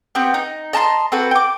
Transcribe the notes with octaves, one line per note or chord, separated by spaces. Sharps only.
B3 C4 G4
D#4
D#5 A5 A#5 C6
C4 F#4 A4 B4
G5 D6